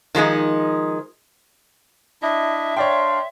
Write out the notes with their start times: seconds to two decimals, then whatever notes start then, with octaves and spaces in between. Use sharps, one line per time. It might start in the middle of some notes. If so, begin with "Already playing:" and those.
0.15 D#3 F3 G#3 D#4
2.22 D4 E4 D#5 E5
2.77 D4 C#5 D5 F5 G5 C6